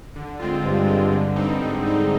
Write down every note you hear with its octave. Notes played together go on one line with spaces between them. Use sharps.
D3
G#3 C4 F4
G2 D3
G#3 C4 F4
D3
G3 C4 D#4
G#2 D3
G3 C4 D#4